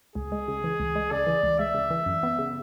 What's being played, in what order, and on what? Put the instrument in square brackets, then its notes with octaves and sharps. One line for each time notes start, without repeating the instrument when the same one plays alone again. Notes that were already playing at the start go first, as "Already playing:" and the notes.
[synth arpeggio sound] C#2 [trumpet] G#4
[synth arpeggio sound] G#3
C#3
E3
C#2
G#3
[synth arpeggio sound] C#3 [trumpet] D5
[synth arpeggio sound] E3
C#2
[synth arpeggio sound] G#3 [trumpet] E5
[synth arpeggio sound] C#3
E3
F#2
B3
C#3